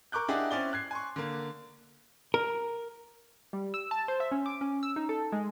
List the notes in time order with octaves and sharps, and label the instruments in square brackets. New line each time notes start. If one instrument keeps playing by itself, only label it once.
[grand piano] A#4 C#6 D6 F#6 G6
D4 E4 G4 G#4 D#5 F#5
C4 C#4 E4 D5 G7
F#6 G#6 C7
G#5 C6 C#6
D3 A#3
[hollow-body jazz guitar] A#4
[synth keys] G3
E6
A5
C5
E5
C#4
D6
C#4
E6
D#4
A4
G#3